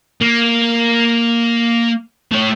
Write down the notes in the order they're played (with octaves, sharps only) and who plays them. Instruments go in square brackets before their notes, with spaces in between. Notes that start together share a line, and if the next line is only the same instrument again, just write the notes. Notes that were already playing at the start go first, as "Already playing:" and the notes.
[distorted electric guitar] A#3
A3 C#5